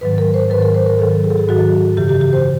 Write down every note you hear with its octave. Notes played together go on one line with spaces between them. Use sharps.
G#2 D#3 F#3 B4
A#4
C5
G#2 D#3 F#3 B4
A#4
C5
A#4
G#2 D#3 F#3 A4
G#4
A4
G#4
G#2 D#3 F#3 F#4
F#2 C#3 E3 G4
G4
G4
C5